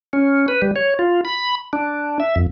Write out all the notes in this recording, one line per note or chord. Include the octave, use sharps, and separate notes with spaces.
C#4
B4
G3
C#5
F4
B5
D4
E5
F2